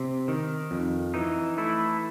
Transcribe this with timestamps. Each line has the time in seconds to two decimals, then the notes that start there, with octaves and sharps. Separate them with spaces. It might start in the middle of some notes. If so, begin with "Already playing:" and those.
Already playing: C3
0.28 D#3
0.71 F2
1.14 E3 D#4
1.58 A3 E4